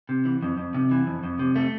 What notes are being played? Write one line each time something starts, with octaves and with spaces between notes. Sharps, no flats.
C3
E3
F2
F2
C3
E3
F2
F2
C3
A3